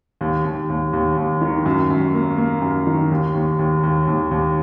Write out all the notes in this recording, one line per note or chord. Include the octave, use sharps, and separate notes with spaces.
D#2
D#2
D#2
D#2
D#2
D#3
F#2
F#2
A#3
A#3
F#2
D#3
D#2
D#2
D#2
D#2
D#2
D#2